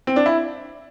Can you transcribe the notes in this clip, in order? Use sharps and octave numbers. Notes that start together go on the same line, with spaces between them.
C4
D4
E4